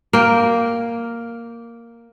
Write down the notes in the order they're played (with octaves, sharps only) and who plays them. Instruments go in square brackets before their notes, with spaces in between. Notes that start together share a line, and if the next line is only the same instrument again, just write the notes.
[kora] A#3 G5